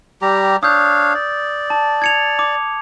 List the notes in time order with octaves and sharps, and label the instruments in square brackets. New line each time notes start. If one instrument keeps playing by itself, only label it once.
[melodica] G3 G4 A#5
[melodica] D4 C#5 F5 [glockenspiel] D#6 E6 G6
[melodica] D5
[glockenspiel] A5
G#6 C#7 F7
D6